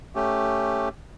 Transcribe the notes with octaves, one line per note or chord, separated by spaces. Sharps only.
A3 C#4 G4